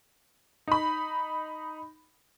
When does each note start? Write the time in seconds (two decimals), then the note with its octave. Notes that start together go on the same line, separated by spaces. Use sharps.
0.68 D#4 B5